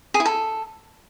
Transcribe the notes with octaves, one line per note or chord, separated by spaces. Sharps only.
G#4
E4
A4